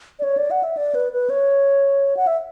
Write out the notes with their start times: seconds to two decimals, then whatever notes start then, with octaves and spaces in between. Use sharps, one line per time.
0.19 D5
0.23 C#5
0.37 D5
0.51 F#5
0.63 E5
0.77 D5
0.95 B4
1.13 B4
1.30 C#5
2.17 F#5
2.27 E5